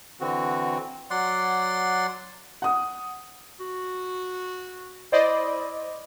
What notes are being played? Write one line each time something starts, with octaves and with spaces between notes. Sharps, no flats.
D3 E3 C4 F#4
F#3 D5 F#5 C6
F#5 D#6
F#4
E4 C5 D5 D#5